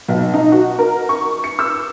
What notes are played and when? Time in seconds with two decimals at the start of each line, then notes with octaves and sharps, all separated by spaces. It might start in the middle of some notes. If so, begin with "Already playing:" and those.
0.08 B1
0.34 D#4
0.52 F#4
0.79 A#4
1.09 C#6
1.44 C#7
1.59 E6